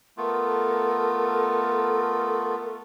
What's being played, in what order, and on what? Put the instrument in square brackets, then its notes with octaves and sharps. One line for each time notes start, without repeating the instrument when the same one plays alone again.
[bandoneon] A3 B3 F4 [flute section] A4 A#4